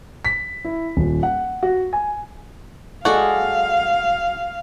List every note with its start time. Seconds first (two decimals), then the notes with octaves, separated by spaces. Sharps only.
0.25 B6
0.65 E4
0.97 D#1
1.23 F#5
1.63 F#4
1.93 G#5
3.05 G#3 F#4 A4 D5 F5